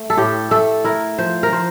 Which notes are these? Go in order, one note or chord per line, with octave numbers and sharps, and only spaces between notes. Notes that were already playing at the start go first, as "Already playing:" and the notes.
Already playing: A3
A4
A2 G4
A3 A4
E4 A#4
F3 C5
A#4
F3 C5